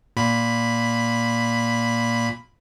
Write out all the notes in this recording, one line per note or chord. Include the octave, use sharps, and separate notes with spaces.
A#2 B5